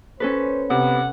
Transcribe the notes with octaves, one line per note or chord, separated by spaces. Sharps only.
C#4 A4 B4 C5
C3 B3 F#5